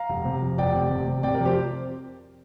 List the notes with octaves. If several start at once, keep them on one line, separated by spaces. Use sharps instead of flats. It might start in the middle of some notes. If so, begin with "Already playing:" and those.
Already playing: F5 A#5
F1
C3
F2
F1 D5 G5
C3
C3
C3
C3 D5 G5
A#4 D5
F2 G4 C5